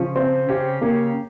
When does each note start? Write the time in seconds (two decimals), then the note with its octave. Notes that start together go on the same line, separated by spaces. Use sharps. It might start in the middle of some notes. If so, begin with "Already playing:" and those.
Already playing: C#3 F3 C#4
0.16 C4
0.49 C#3 C#4 G4
0.81 C#3 A#3 C#4